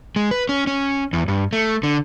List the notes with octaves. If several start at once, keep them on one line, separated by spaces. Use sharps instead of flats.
G#3
B4
C#4
C#4
E2
G2
A3
D3